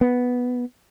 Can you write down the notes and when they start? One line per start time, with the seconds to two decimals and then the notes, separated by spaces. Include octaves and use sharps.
0.01 B3